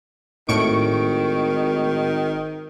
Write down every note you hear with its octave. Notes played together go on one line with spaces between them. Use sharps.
G#1 A2 D#3 C#6 D7